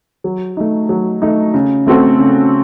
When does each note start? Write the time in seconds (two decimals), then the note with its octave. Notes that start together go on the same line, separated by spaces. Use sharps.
0.24 F#3
0.57 A3 D#4
0.89 F#3
1.22 A3 D#4
1.54 C#3
1.87 A3 C4 F#4 A4
2.19 C#3